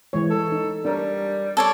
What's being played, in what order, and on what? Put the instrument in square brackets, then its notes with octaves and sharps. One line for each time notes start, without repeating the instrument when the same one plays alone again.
[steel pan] E3 G#3 C#5
[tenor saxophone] A4
[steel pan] D#4
[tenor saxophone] G3 [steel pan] D4 A#4 C#5
[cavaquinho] A4 C#5 D5